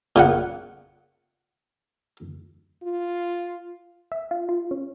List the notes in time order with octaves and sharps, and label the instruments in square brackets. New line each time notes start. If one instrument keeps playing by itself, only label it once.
[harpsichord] A#2 C#3 F#5
[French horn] F4
[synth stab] E5
F4
F4
C#4